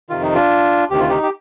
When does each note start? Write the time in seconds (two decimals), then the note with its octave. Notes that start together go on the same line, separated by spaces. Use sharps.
0.10 F2 C3 D#3 F4
0.22 D#4
0.34 D4 F4
0.90 D2 C3 D#3 G4
1.00 F4
1.09 D#4 G4
1.23 G4